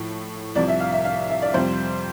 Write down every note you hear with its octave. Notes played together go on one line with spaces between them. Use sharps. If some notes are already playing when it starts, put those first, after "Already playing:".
Already playing: A2 F3 A3
C2 C3 F3 D5
E5
F5
E5
F5
E5
D5
F2 C3 G3 C5